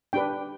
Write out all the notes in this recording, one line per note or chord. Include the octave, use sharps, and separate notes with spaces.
D4 G4 B4 G5